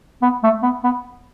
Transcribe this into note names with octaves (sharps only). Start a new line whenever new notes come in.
B3
A3
B3
B3